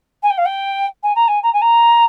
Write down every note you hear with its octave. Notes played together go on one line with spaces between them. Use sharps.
G#5
G5
F5
G5
G#5
A#5
G#5
A#5
G#5
A#5